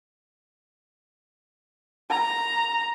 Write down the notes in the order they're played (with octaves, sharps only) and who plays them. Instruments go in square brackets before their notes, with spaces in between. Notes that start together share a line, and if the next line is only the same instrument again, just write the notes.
[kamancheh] A#5